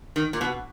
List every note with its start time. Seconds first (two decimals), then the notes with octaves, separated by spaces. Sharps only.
0.16 D#3
0.33 A#2
0.41 B2